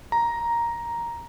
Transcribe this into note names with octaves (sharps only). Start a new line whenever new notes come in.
A#5